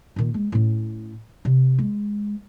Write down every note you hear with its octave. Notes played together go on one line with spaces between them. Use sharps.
A#2 D#3
G#3
A2 C#4
C3
G#3